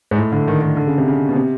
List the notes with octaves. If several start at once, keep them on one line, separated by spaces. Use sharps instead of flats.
G#2
A2
D3
D#3
D#3
D3
C#3
C3
C#3
B2
C3